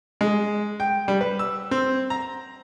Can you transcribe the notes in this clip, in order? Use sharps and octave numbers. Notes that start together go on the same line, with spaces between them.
G#3
G5
G3
B4
E6
C4
A#5